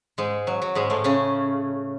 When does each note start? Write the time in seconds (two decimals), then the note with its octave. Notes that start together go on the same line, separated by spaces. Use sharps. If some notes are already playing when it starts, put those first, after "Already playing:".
0.18 G#2 G#3
0.47 F#3
0.62 F#3
0.75 G#2 G#3
0.90 A2 A3
1.04 C#3 C#4